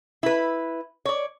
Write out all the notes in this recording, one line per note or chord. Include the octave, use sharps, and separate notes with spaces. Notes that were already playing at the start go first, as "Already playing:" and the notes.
E4 B4
C#5 D5